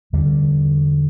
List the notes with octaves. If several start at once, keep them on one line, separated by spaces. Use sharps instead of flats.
E2 D3 G3